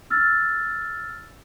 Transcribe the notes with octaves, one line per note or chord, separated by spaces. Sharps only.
E6 F6 A6